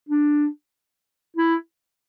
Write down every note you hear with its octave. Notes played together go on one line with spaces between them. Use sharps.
D4
E4